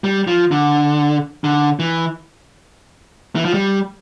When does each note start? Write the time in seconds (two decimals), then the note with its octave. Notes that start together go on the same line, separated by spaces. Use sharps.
0.04 G3
0.27 F3
0.51 D3
1.44 D3
1.79 E3
3.36 E3
3.45 F3
3.54 G3